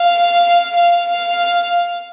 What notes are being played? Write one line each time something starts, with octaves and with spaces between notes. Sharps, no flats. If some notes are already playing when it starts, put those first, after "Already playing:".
Already playing: F5
F5